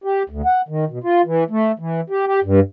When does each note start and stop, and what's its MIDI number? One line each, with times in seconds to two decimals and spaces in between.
0.04 0.23 67
0.29 0.42 38
0.46 0.61 78
0.69 0.85 51
0.89 0.99 47
1.04 1.22 65
1.25 1.44 52
1.50 1.72 57
1.79 2.01 52
2.10 2.26 67
2.27 2.40 67
2.44 2.60 43